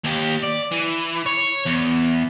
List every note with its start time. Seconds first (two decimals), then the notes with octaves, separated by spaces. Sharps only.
0.04 D#2 G4
0.44 D5
0.72 E3
1.26 C#5
1.66 E2